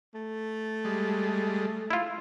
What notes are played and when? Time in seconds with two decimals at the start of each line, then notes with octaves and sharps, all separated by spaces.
0.14 A3
0.85 G3 G#3
1.91 E4 F4